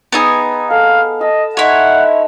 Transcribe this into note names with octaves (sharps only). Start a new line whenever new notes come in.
B3 D#4 G#4 B5 E6
A4 F5
D#5 A5 E6
D#4 E4 C#5 E5 F#5 C6